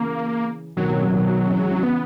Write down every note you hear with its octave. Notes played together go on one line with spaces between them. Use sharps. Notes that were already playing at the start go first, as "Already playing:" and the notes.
Already playing: C#3 E3 A#3
B2 D#3 F#3
B2 D#3
A#2 C#3
B2 D#3
C#3 E3
E3 G#3
C#3 E3
C#3 E3 B3